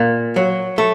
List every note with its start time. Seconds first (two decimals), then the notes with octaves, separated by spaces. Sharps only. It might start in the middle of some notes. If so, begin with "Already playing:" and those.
Already playing: A#2
0.36 F#3
0.78 A3